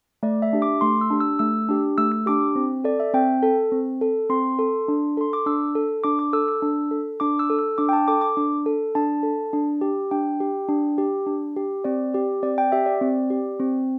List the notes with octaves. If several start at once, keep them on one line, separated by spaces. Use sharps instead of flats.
A3 D5
E5
D4 G4
D6
A3 C6
E6
D4 G4
E6
A3 E6
D4 G4
A3 E6
E6
D4 G4 D6
C4
A4 D5
E5
C4 G5
A4
C4
A4
C4 C6
A4
D4
A4 C6
D6
D4 E6
A4
D4 D6
D6
A4 E6
E6
D4
A4
D4 D6
E6
A4
E6
D4 D6
G5
A5
A4 D6
D6
D4
A4
D4 A5
A4
D4
G4
D4 G5
G4
D4
G4
D4
G4
C4 D5
G4
C4 D5
G5
G4 E5
D5
C4
G4
C4